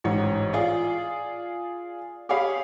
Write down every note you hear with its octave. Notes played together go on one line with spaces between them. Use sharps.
A1 G#2 C#5
F4 G#4 D5
G4 G#4 C#5 F5 B5